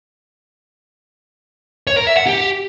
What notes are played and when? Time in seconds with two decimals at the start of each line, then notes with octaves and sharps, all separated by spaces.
1.87 C#5
1.97 A#4
2.07 E5
2.17 F#5
2.27 G4